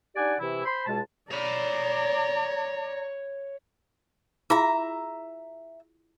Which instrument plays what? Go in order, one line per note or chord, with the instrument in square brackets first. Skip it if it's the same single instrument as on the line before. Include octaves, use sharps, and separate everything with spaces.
[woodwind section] D4 D#4 G4 D5 F#5 G#5
C3 E3 E4
C5 B5 C6
C#2 B2 G#3 A5
[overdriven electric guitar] C#5 B5 [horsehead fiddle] D5 A#5
[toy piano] E4 F4 G#4 [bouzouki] E5 A#5